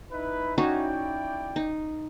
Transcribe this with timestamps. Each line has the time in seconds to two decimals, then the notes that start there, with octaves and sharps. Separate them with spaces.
0.12 D#4 E4 B4
0.58 C#4 D#4 E4 F#4 D5 G5
1.56 D#4